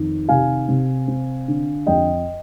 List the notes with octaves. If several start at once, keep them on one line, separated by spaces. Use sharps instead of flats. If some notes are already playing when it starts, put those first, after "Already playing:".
Already playing: F2 D#3
C3 F5 G#5
C3
C4
D3
F2 D#5 G5